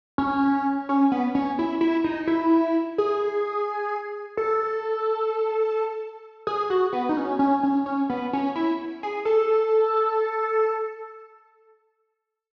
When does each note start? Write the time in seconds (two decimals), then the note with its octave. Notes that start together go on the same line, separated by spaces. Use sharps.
0.18 C#4
0.89 C#4
1.12 B3
1.35 C#4
1.59 E4
1.81 E4
2.04 D#4
2.27 E4
2.98 G#4
4.37 A4
6.47 G#4
6.70 F#4
6.93 B3
7.09 D#4
7.17 C#4
7.39 C#4
7.63 C#4
7.86 C#4
8.10 B3
8.33 C#4
8.56 E4
9.03 G#4
9.25 A4